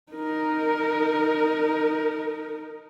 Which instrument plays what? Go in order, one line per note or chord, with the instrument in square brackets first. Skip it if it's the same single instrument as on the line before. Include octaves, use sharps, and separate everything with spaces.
[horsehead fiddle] D#4 A#4